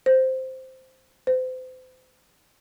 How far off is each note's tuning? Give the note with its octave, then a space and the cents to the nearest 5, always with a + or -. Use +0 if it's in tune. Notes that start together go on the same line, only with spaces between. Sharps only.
C5 -5
C5 -35